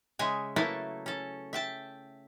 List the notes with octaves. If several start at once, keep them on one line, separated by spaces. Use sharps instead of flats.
C#3 G#3 E5 G#5
F#3 A3 A#3 E4 A4 B4
C#4 A4
E5 G5 A5